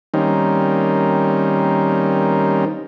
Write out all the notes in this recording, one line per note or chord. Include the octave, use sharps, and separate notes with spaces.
D#3 G3 A#3 C4 C#4 D#4